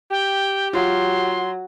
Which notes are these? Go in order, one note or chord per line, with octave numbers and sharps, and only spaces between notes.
G4 G5
F#3 F4 C6